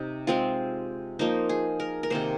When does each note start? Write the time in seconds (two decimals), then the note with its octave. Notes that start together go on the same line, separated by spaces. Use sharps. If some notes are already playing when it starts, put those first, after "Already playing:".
Already playing: C3 D#4
0.27 G#3 C4 F4
1.19 F3 A#3 D#4 C5
1.49 G#4
1.80 A#4
2.03 A#4
2.10 C3 D#3 A#3 C5